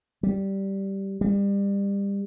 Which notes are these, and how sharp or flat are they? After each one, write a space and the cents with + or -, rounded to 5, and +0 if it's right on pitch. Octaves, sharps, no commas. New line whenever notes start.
G3 -10
G3 +30